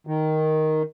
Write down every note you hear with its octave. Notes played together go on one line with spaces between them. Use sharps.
D#3